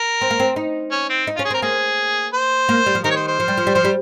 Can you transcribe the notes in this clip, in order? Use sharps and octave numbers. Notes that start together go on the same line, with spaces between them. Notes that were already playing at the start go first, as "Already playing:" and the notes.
Already playing: A#4
C4
A#3
C4
D#4
C#4
C4
D#4
F4
C#4
G#4
C4 A#4
A#3 G#4
C5
A#3
G3
F3
D#3 A#4
C#5
C5
C5
F3
G3
F3
G3
F3 C5
G3